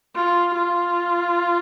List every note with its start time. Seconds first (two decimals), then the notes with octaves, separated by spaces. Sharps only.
0.15 F4
0.54 F4